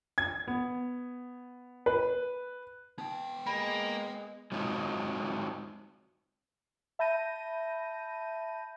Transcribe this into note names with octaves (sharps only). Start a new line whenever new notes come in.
G#6
B3
B4
B3 D#4 G5
G#3 A#3 B5
F#3 G#3 C4 D#4 F4 F#4
E5 A5 B5 G6 A#6 D#7